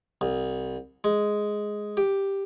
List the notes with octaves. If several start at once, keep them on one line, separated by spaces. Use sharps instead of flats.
C2
G#3
G4